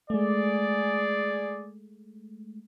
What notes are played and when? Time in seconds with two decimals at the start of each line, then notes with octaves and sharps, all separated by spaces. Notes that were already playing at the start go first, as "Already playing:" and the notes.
0.10 G#3 A3 G#4 D5